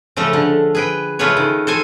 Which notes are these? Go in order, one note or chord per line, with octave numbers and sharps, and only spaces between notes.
C#3 F3 A3 A4
D3
G#4 B4 G5
C#3 A3 F4 G#4 B4 C#5
D#3
A4 C5 G#5